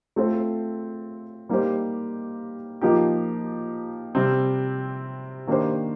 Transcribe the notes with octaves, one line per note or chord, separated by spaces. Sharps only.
A3 C4 F4 A4 C5
G3 A#3 D#4 G4 C5
F3 A#3 D#4 G4
C3 G3 C4
D#3 A#3 D4 G4 C5